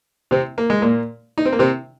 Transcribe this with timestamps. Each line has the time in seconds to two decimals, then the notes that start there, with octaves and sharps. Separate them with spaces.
0.31 C3 C4
0.58 A#3
0.70 G#3
0.82 A#2 A#3
1.38 D#4
1.45 C4
1.53 A#3
1.59 C3 C4